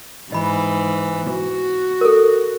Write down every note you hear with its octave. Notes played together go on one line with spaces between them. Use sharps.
G#2 E3 D#5 B5
F#4
A4 A#4